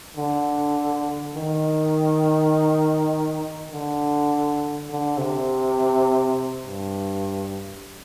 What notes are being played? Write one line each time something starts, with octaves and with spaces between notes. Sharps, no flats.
D3
D#3
D3
D3
C3
G2